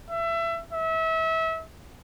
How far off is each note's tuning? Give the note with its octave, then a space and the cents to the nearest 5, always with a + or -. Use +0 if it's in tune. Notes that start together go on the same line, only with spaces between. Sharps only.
E5 +25
E5 -30